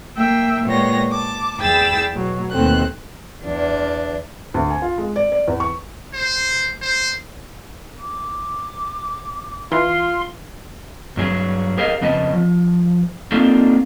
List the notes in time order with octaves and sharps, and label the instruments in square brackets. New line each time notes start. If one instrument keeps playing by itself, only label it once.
[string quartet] A#3 E5 G5
A#2 G#3 B3 C#5 G5 A#6
A5 D6
E2 G#4 G5 B5 E6 A6
B2 F#3
D#2 B2 A3 C4 F#6
[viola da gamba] E2 D4
[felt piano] D2
G#5
F4
G#3
D5
D5
E2
C#6
[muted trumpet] C5
C5
[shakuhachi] D6
[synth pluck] E3 [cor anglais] F4 [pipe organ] C6
[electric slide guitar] G2 F#3 G#4
G4 G#4 A#4 C5 D#5 F5
F2 C#3 B3 D#5 G#5 A5
F3
A#3 C4 D4 D#4 F4 A4